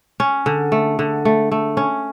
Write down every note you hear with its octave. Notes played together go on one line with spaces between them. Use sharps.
C#4
D3
A3
D3
A3
A3
C#4